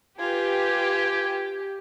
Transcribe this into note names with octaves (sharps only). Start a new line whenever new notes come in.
F4 G4 B4 G#5